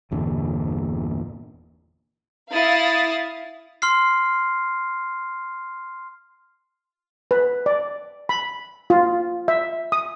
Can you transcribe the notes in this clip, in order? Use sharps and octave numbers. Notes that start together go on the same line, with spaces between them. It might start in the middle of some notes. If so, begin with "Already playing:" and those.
G1 E2 A#2 D3
E4 F5 D#6 A6
C6 F6 C7
B4
D5
B5
F4
E5
D#6